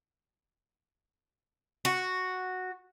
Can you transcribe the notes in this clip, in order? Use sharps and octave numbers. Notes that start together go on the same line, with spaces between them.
F#4